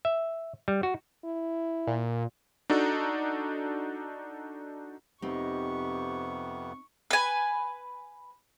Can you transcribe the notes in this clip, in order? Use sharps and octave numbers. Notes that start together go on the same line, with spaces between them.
E5
G3
F#4
E4
A#2
D4 D#4 F#4 A4
F2 C3 B3 C4 D#4 G4 C#6
B4 G#5